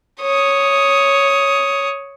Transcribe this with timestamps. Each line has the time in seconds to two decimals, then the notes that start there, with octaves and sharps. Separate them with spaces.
0.21 C#5 D#6